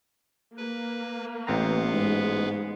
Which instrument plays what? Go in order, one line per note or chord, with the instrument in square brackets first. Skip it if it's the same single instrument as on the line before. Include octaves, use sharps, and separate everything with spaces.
[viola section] A#3 [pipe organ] B4
[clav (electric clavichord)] A1 C4 A#5 [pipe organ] B3 B4 F5
[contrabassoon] G#2 [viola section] G#3